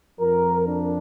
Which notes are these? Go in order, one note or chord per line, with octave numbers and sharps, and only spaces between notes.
F2 F3 A#4
D4